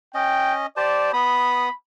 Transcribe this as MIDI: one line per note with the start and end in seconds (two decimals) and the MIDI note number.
0.14 0.66 61
0.14 0.66 75
0.14 0.53 79
0.77 1.12 67
0.77 1.12 72
0.77 1.09 74
0.77 1.12 81
1.13 1.69 59
1.13 1.74 83
1.13 1.69 87